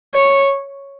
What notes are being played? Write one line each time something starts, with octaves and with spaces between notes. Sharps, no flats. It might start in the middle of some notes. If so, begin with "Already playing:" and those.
C#5